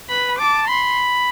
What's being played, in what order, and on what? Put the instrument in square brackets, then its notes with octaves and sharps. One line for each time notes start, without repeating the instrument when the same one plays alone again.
[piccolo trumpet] B4 [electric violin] B5
[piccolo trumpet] A5 [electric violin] D6
[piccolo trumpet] B5 [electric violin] C6